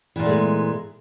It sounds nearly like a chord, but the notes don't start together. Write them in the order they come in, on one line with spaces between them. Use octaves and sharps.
E3 A#2 B3 A3 G#3